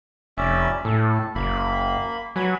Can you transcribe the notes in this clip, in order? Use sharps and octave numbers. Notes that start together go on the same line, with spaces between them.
F1 C#4 D5 E5
A2 A4
F#1 A#3 B5
F#3 B4 G#5 B5